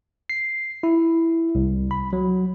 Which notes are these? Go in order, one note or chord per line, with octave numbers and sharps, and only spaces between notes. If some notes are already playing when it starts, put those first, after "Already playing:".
C7
E4
C2
B5
F#3